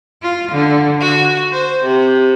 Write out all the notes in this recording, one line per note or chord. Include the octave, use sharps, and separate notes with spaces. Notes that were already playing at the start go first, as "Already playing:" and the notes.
F4
D3
F#4
C5
C3